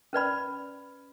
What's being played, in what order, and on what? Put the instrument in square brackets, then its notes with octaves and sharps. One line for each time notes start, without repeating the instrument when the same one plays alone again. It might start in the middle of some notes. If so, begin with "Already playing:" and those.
[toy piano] C#4 B4 D5 B5